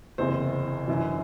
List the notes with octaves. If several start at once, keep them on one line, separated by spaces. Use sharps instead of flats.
F#1 E2 C3 E3 C5
G1 F#2 E3